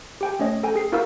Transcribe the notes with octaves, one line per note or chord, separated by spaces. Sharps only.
G4 G5 G#5
A3 C#4 C#5 D#5
A4 G5 G#5
G#4 C7
E4 F#4 A#4 F5 B5 E6